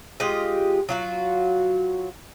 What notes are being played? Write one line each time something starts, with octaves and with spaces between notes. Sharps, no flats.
G#3 F4 G4 D#5
F#3 F4 F#4